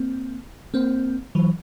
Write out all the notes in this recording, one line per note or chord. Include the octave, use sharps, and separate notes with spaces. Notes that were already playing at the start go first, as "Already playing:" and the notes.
Already playing: A#3 C4
A#3 C4
E3 F#3